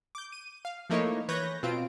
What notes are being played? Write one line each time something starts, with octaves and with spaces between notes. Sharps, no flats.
D6 G6
D#7
F5
F3 A3 A#3 D#4 E4 C#5
E3 B4 C#5 G6 A#6
B2 C4 F4 D7